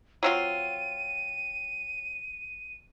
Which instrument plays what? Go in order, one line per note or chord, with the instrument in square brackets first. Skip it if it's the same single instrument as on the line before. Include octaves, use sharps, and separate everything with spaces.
[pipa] F#3 C4 F4 [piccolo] D#7